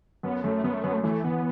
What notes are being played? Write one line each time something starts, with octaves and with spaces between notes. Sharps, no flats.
F#2 B3
F#2 A3
F#2 B3
A3
F#2 B3
A3
E3 A3
E3 B3